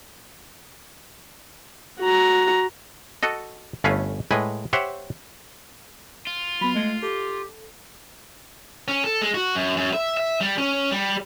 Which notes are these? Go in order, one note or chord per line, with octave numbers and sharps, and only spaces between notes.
F#4 A#5
F#4 A4 D#5
G1 A3 C#4 B4 F5 G#5
A2 G#3 B4 G#5
G4 C5 C#5 E5 F#5
F4
F#3 B3 B5
G#3 A3
G4 A4
C#4
A4
G#3
F#4
F#2
F#2
E5
E5
G3
C#4
G3